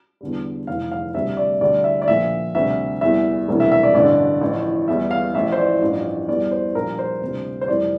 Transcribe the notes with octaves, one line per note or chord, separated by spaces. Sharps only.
E2 D3 G3
F1 F2 E3 F5
F5
D2 C3 G3 E5
D5
D2 D3 G3 D5
E5
D5
A#1 A#2 F3 E5
D2 C3 G3 E5
E2 E3 G3 E5
E1 D2 C3 E3 G3
E5
E5
D5
A1 G2 D3 D5
A1 A2 F3
E2 E3 G3 E5
F5
A1 A2 F3 E5
C5
D5
A1 G2 F3
E2 E3 G3 D5
C5
A#1 A#2 G3 A#4
C5
D2 C3 G3
C5
F1 F2 E3 G3 D5